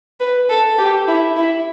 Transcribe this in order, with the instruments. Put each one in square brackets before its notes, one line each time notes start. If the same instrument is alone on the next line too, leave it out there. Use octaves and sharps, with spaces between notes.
[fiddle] B4
A4
G4
E4
E4